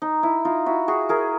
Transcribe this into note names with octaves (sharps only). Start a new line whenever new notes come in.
D#4
E4
D#4 F4
E4 F#4
F#4 G#4
G#4 A#4